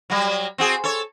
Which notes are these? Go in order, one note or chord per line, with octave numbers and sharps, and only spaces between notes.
F#3 G3
C4 F#4 G#4
A4 C#5